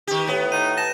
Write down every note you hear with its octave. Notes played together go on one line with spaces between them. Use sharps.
D#3 G4
A2 B3
D#4 D#7
A5 A#6 E7